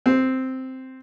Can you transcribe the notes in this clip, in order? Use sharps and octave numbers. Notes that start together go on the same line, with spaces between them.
C4